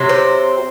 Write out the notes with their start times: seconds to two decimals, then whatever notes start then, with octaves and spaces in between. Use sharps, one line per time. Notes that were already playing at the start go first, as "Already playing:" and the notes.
Already playing: C3 F#3 C4
0.09 C5